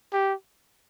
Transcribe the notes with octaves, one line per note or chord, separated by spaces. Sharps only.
G4